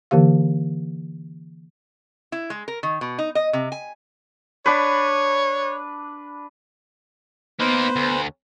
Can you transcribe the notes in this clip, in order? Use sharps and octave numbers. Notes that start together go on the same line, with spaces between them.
D3 E3 A#3 G4 F5
E4
G#3
A#4
D#3
B2
D#4
D#5
C3
G#5
D4 B4 C#5
A#3 B3 D#4 B4 C5
D2